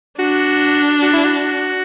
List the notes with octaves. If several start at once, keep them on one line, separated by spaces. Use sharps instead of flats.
D4 F#4
F#4
E4
F#4